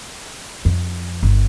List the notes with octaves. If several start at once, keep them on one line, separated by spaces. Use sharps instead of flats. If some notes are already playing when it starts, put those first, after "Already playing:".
F2
G1